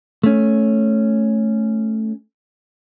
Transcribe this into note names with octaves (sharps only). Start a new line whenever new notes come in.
A3 C#4